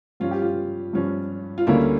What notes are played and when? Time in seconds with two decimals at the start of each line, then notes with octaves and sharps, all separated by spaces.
0.20 G2 F3 C#4 F4
0.31 G4
0.42 F4
0.93 G2 F3 C#4
1.58 F4
1.67 D2 D3 G3 A#3 C#4 E4